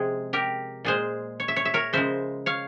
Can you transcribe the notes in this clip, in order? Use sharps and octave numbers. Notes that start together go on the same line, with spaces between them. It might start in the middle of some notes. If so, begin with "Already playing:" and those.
Already playing: C3 F3 G#3 G#4
G4 A#4
A#2 G#3 G#4 C5
C#5
E5
C#5
E5
A#4 C#5
C#3 F3 G#3 C5 E5
C#5 F5